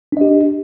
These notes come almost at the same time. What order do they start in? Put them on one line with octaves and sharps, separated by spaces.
D4 D#5 G4